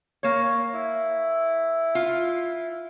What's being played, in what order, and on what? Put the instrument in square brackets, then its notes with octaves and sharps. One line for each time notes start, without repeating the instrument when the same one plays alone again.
[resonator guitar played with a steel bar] A#3 C#5
[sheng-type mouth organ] E4
[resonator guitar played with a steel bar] F4